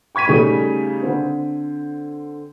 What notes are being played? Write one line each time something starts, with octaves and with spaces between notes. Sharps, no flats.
G5 C#6 G#6 B6 D#7
C#3 G3 A3 C#4 D#4
D3 C4